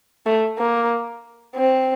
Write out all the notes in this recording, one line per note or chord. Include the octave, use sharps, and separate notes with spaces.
A3
A#3
C4